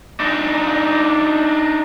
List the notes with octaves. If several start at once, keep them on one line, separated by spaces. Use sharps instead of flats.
D4 D#4